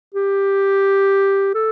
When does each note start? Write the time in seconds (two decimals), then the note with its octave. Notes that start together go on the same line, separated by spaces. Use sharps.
0.14 G4
1.54 A4